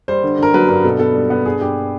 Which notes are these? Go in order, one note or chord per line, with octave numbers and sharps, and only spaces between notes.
G3 C5
D3
D3 A#4
F#3 B4
G2 A#4
B2 A4
B3 A4
G3
B3
G2 G#4
G2 G4